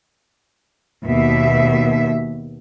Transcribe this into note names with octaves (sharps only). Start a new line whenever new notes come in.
D#2 B2 E5